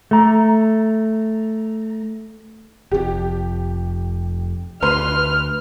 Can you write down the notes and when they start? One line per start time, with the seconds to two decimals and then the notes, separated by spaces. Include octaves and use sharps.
0.11 A3 A#5
2.91 F1 F2 G4
4.83 D2 B4 C6 F6